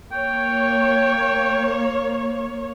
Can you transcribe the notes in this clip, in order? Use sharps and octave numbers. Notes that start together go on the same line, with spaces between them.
A#3 C#5 G5